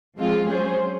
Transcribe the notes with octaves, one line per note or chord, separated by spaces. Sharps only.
F3 G#3 C4 F4
F#3 C#4 G#4 C5